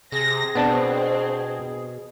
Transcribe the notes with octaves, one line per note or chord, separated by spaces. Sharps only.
C3 G#4 A#6
B2 B3 C4 D4 A5